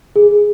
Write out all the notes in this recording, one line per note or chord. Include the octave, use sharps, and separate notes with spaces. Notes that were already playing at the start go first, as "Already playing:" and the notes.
G#4